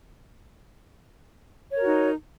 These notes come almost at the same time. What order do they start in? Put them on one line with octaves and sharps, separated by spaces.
C#5 A#4 F#4 D#4